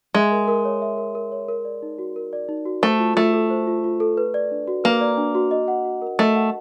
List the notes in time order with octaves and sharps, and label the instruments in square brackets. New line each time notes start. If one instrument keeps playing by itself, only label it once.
[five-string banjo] G#3 [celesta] E5
[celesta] A#4
A#4
C#5
E5
A#4
A#4
C#5
A#4
D5
D#4
F#4
A#4
D5
D#4
F#4
[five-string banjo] A3 [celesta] C5
[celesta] F4
[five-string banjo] A3 [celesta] F4
[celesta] A4
C5
F4
F4
A4
B4
D5
D4
F#4
[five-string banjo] A#3 [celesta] B4
[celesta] D5
D4
F#4
D#5
F#5
F#4
A#4
[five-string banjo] A3 [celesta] D#5
[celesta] F#5